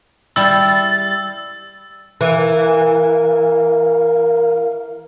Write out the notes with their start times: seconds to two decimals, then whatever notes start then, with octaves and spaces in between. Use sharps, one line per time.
0.36 G3 E4 E6 A6
2.21 E3 A#4 F5